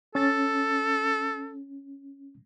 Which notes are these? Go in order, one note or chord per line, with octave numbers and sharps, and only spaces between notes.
C#4 A4 A6